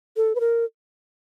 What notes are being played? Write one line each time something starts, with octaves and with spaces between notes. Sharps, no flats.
A4
B4
A#4